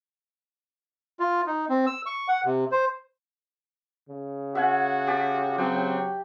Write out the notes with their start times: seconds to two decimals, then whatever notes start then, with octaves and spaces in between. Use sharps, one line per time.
1.20 F4
1.47 D#4
1.69 C4
1.86 E6
2.06 C#6
2.28 F#5
2.45 C3
2.72 C5
4.09 C#3
4.55 F#4 E5 F#5 G#5
5.07 G4 A5
5.58 F#3 C4 G5